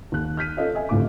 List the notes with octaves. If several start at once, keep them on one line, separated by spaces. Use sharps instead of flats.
D#2 F#6
F6 G6 B6 D#7
C#4 F4 A4 C#5 D#5 F5
D#5 E5 G#5
A1 D2 A2 C3 F4 D6